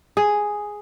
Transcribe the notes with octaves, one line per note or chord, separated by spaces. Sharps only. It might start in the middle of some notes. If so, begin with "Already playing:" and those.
G#4